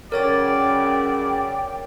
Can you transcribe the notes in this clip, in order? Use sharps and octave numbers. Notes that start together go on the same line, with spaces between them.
F#2 C#3 A#4 C#5 D5 G5 A6